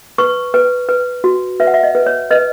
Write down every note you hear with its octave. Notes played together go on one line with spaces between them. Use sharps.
B4 C#6
B4
B4
F#4
B4 E5
F#5
E5
D#5
B4
C#5
B4 D#5